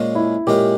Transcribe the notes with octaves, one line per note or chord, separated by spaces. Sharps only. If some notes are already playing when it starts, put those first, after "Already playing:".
Already playing: A#2 G#3 C#4
E4
A#2 G#3 C#4 G4